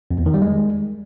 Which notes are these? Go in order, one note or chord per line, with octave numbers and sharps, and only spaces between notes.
F2
E2
D#3
G3
G#3